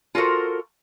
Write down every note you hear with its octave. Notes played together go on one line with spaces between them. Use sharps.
F4 F#4 A4 A#4 C5